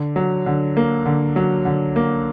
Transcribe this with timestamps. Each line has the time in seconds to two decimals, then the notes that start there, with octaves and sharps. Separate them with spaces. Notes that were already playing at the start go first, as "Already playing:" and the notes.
Already playing: D3
0.16 F#3
0.46 D3
0.77 A#3
1.06 D3
1.36 F#3
1.65 D3
1.96 A#3